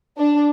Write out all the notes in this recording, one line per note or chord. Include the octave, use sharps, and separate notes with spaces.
D4